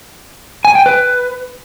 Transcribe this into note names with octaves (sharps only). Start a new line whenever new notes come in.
G#5
G5
B4